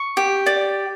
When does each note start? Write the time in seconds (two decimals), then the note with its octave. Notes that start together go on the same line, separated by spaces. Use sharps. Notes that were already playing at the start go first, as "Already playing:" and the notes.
Already playing: C#6
0.17 G4
0.46 D5